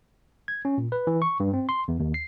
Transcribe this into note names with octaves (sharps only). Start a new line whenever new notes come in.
G#6
C#4
A#2
B4
E3
C#6
G2
C4
C6
E2
D#2
C7